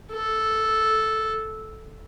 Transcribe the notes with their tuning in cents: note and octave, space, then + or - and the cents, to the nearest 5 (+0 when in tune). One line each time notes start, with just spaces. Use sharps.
A4 -5